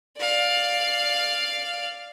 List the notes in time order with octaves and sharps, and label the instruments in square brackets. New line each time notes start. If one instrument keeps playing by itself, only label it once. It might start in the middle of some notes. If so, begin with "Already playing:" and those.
[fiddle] D5 F5